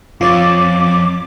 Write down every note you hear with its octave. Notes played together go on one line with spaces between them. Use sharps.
F2 F4 C#5 D6 A6